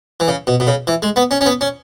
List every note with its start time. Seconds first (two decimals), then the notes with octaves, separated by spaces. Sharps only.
0.20 E3
0.28 C#3
0.47 B2
0.60 B2
0.67 C#3
0.87 E3
1.02 G#3
1.16 B3
1.31 C#4
1.41 C#4
1.46 B3
1.61 C#4